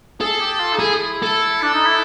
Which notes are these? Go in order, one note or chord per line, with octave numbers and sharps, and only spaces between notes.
G#4 A4
G4
F4
D#4
E4 G#4
A4
D4
D#4
E4